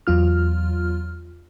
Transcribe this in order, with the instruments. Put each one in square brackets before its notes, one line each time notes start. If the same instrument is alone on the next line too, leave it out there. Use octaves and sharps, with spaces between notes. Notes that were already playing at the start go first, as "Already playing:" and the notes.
[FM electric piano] E2 F#3 F4 F6